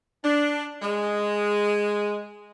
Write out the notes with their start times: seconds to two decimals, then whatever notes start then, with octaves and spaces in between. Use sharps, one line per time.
0.24 D4
0.82 G#3